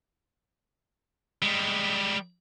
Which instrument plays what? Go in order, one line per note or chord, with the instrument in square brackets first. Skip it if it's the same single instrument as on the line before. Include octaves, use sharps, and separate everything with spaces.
[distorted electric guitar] G3 G#3